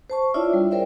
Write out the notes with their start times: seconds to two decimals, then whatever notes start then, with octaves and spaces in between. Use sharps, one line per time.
0.10 C5 A5 C#6
0.34 D4 E4 F4 C#5 D5 E5
0.53 G3
0.71 G#4 A#4 C5 D5 E5 G5